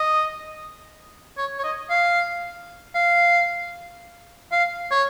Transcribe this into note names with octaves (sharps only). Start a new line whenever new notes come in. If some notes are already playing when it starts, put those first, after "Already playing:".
Already playing: D#5
C#5
C#5
D#5
F5
F5
F5
C#5